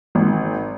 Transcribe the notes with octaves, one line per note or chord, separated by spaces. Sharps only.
G#1